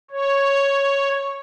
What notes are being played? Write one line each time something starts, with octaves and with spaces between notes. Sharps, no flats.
C#5